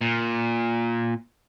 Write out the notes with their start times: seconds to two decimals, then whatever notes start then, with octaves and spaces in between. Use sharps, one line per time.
0.01 A#2